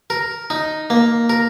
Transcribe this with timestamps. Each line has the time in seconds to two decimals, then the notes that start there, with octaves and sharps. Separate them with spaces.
0.10 A#4
0.50 D#4
0.90 A#3
1.29 A#4